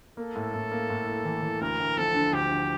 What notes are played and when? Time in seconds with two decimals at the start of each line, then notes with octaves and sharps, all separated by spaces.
0.17 A#3 A4
0.36 A2
0.54 A2
0.72 A#3
0.90 A2
1.07 A#3
1.25 E3
1.43 E3
1.61 D2 A#4
1.80 D2
1.97 F3 A4
2.15 D3
2.33 D2 G4
2.50 D3